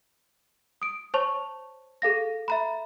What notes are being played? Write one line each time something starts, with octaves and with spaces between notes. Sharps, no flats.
D#6 D7
C5 C#5 A5 C#6 F7
G#4 A4 F5 A#6
E5 A#5 B5